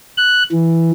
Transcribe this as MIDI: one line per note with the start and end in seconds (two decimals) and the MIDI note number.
0.17 0.43 90
0.52 0.92 52